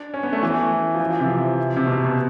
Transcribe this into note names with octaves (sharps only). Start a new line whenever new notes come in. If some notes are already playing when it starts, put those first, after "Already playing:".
Already playing: D4
C#4
B3
A3
E3
F3
E3
F3
C3
C3
B2
B2